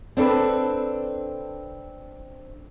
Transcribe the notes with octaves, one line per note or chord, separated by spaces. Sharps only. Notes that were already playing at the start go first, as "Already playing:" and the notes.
C4 D4 A4 B4